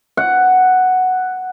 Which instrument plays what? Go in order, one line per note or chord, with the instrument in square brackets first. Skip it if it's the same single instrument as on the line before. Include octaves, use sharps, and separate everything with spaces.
[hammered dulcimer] F#5